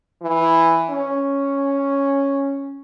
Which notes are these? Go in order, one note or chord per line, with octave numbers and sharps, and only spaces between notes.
E3
C#4